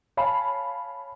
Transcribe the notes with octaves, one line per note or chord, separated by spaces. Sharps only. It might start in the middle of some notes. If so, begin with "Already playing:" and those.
C#5 F5 G#5 A5 B5